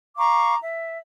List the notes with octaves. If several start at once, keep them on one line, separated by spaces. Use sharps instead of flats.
F5 A#5 C#6 D6
E5